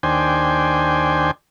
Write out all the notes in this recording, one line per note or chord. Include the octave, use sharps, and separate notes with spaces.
D#2 D4 C5 G5 G#5